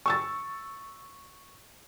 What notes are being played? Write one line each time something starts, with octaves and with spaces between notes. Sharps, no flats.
C#6 E6 A6